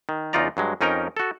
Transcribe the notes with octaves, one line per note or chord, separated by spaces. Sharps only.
D#3
E2 C#3 D#4 F4 D5 A#5
G2 F#3 G#3
F2 C#4 D#4 A#4 G5 A#5
F#4 A4